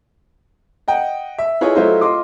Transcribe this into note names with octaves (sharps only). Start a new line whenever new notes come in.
D#5 F#5 G5
E5
E4 F4 G#4 B4 C#5 D#5
F#3 A3 E4 F4 C5 D#5
F4 D#5 C6 D6